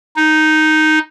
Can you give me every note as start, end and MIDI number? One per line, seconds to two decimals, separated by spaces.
0.16 0.99 63